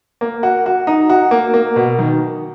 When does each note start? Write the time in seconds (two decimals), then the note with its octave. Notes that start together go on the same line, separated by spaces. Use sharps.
0.21 A#3
0.43 F#4
0.66 F#4
0.87 D#4
1.09 F#4
1.31 A#3
1.54 A#3
1.76 B2
1.99 D#3